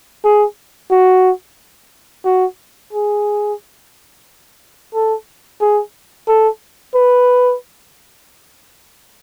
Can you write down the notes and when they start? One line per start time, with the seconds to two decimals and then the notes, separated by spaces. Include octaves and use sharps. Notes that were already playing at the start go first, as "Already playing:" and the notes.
0.25 G#4
0.91 F#4
2.25 F#4
2.93 G#4
4.94 A4
5.61 G#4
6.28 A4
6.95 B4